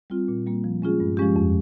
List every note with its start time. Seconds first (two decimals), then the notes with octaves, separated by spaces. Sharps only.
0.10 G3 C4 F4
0.28 A#2
0.46 G3 A#3
0.64 F3
0.82 G#3 C#4 F4 G#4
1.00 G2
1.17 F3 G#3 C#4 G4
1.36 F2